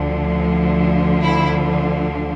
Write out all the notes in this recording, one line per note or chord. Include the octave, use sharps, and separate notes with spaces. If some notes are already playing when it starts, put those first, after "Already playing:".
Already playing: D2 D3 F3
E4